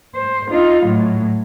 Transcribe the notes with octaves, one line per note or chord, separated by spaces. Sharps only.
C5
D#4 F4
A2 F#3